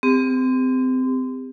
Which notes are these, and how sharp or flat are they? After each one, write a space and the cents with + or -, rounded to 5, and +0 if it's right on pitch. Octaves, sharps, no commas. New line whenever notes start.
C4 -30 G4 +40